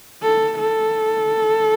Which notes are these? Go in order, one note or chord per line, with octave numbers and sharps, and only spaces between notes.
A4
A4